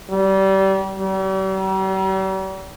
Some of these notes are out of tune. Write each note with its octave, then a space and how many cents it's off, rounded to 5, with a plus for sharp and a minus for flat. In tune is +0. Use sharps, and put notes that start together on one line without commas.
G3 -25
G3 -45